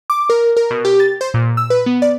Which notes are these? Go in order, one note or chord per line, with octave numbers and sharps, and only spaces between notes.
D6
A#4
A#4
B2
G4
A6
C5
A#2
E6
B4
B3
D5